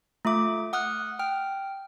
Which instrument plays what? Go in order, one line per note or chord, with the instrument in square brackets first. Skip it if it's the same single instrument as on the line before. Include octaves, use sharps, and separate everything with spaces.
[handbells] A3 F4 E5 D6
F#5 D#6 F6 F#6
G5 F6